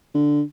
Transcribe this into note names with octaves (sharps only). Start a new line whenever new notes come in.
D3